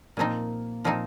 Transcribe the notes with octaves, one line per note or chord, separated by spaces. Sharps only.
A#2 F3 A#3 C4 D#4
A#2 F3 C4 D#4